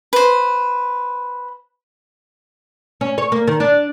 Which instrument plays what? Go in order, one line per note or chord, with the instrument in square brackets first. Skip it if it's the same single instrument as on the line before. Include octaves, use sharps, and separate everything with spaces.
[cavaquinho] B4 C5
[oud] C#4
C#5
A#3
D#3
D4